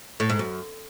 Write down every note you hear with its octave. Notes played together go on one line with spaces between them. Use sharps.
A2
G#2
F#2